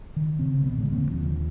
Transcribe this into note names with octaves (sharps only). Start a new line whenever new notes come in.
D#3
C#3 C4
A#1 B2 B3
A2 D3 E3 G#3
E1 D3 A#3 C4
D#2 D3 F3